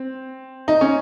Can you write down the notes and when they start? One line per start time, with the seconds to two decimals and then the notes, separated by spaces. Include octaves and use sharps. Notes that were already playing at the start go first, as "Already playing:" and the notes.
Already playing: C4
0.68 D#4
0.81 C#4